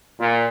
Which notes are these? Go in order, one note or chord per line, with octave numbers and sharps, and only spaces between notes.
A#2